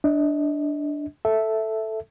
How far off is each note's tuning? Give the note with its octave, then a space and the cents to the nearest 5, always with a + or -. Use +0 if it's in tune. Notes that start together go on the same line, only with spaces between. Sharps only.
D4 +0 D#5 +35
A4 +0 E5 +0